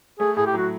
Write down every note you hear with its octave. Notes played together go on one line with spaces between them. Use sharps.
A3 G#4
A2 G#4
G4
F#3 F#4